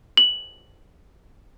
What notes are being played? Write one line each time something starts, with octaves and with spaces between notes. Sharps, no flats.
F#7